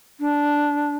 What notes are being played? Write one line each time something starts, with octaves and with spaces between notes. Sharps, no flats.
D4